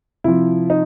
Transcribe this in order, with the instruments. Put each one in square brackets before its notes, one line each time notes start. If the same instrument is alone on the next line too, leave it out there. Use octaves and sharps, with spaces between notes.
[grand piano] C3 F3 E4
D#4